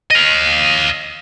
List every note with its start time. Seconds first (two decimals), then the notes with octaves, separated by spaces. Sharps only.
0.11 D#5 F5